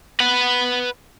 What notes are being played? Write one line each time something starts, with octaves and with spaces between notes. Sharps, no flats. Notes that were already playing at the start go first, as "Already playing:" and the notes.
B4 F#5